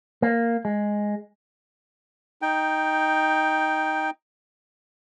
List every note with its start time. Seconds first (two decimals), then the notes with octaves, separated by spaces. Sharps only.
0.22 A#3
0.65 G#3
2.42 D#4 G5